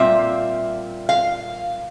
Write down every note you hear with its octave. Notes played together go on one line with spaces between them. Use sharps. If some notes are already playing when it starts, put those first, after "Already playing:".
Already playing: A#2 G3 C4 F4 E5
F5